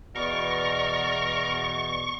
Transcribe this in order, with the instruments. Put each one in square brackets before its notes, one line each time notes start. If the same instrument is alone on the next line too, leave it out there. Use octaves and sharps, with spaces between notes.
[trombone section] E2 B2 [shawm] A#4 [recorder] D5 [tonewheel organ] C#6